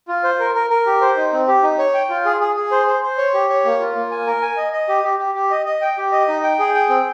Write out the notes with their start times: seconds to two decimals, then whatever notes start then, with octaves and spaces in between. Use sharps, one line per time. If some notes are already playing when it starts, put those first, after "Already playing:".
0.08 F4
0.24 C5
0.40 A#4
0.55 A#4
0.70 A#4
0.86 G4
1.01 C5
1.17 D#4
1.33 C4
1.48 G4
1.63 D#4
1.79 C#5
1.94 G5
2.09 F4
2.25 G#4
2.41 G#4
2.56 G#4
2.71 C5
2.87 C5
3.03 C5
3.18 C#5
3.34 G4
3.49 C#5
3.65 A#3
3.80 F4
3.95 A#3
4.11 G#5
4.27 A#4
4.42 G#5
4.57 D#5
4.73 D#5
4.89 G4
5.04 G4
5.19 G4
5.35 G4
5.51 D#5
5.66 D#5
5.81 G5
5.98 G4
6.12 D#5
6.28 D#4
6.43 G5
6.59 G#4
6.74 G5
6.89 C4